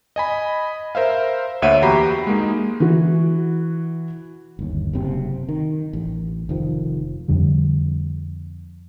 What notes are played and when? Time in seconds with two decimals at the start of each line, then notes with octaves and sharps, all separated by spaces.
0.16 D#5 G#5 B5
0.95 A#4 C5 E5 F5
1.62 D2 A#3 C#5 E5 F#5 D#7
1.82 E2 F#4 G4 A#5 B5 C7
2.27 G#3 A#3 D#4
2.80 E3 F#4
4.59 G1 D#2
4.93 F#1 F#2 C3 C4
5.49 D#3
5.93 A1
6.49 F1 D#3 F3
7.28 F2 D3 G3